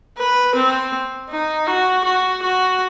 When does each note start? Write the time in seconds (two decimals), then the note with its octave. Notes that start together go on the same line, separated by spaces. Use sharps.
0.18 B4
0.55 C4
1.29 D#4
1.67 F#4
2.04 F#4
2.42 F#4